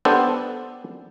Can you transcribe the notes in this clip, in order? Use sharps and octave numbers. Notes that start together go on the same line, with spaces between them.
B3 D4 G4 A4 C5